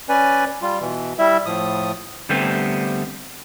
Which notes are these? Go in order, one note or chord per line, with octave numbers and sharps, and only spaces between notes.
C#4 B4 D5 G#5
G3 F4
B2 E3
G3 E4 E5
A2 F3 D#6
D3 G3 A3 B3 C4 G4